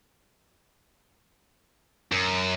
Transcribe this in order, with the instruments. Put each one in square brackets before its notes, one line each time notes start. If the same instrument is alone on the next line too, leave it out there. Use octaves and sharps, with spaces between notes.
[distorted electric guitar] F#2